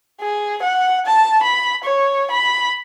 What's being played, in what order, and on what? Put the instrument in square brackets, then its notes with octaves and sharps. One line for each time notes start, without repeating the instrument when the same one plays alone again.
[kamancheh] G#4
F#5
A5
B5
C#5
B5